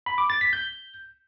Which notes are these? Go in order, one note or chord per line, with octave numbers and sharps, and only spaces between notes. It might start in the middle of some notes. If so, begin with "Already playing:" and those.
B5
D6
A6
B6
G6